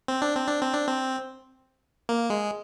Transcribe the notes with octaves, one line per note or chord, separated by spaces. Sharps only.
C4
D4
C4
D4
C4
D4
C4
A#3
G#3